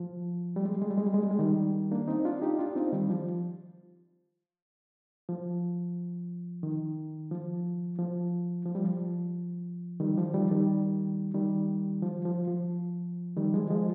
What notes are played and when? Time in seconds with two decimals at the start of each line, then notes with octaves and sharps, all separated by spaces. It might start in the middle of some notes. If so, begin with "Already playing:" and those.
Already playing: F3
0.56 G3
0.65 G#3
0.73 G3
0.82 G#3
0.90 G3
0.98 G#3
1.06 G3
1.14 G#3
1.23 G3
1.31 G#3
1.39 D#3 G3
1.92 A#3 D4
2.08 C4 D#4
2.25 D4 F4
2.42 D#4 G4
2.59 D4 F4
2.75 C4 D#4
2.92 D#3 G3
3.10 F3
5.29 F3
6.63 D#3
7.31 F3
7.99 F3
8.65 F3
8.75 G3
8.84 F3
10.00 D#3 G3
10.18 F3
10.34 D#3 G3
10.51 D#3 G3
11.34 D#3 G3
12.02 F3
12.25 F3
12.48 F3
13.37 D#3 G3
13.54 F3 G#3
13.70 F3 G#3